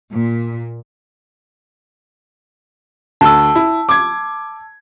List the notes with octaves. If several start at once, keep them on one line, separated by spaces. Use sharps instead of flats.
A#2
D2 A5 E6
E4
D6 G#6